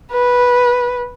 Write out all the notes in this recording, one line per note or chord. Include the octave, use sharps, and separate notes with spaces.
B4